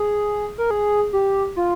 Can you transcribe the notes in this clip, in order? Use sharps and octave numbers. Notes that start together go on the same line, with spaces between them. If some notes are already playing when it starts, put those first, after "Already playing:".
Already playing: G#4
A#4
G#4
G4
F4